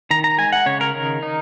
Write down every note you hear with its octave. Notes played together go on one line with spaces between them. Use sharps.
D#3 A#5
A#5
G#3 G#5
F#5
C#3 C#5
A#4
D#3
D#4